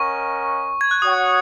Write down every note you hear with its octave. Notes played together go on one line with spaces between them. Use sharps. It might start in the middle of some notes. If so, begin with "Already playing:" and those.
Already playing: C#4 A#4 D#5 F#5 C#6
G#6
F#6
F#4 C#5 F#5 D#6